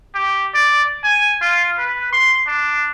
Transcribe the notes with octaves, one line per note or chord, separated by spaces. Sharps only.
G4
D5
G#5
F4
B4
C6
D4